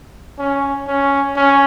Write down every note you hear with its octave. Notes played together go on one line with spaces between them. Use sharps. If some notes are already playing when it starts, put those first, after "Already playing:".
C#4
C#4
C#4